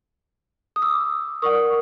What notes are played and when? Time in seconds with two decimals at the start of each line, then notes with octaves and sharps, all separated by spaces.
0.76 D#6
0.82 D6 E6
1.42 A#4 D5 F#5 C#6 D#6